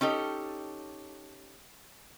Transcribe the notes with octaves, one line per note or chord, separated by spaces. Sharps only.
C#4 D#4 G4 A4